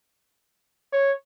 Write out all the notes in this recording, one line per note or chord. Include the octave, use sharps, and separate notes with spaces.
C#5